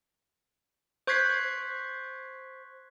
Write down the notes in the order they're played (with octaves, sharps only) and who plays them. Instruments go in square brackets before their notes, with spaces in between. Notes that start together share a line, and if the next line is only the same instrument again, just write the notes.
[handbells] C5 C#6 F#6 G#6 B6 C7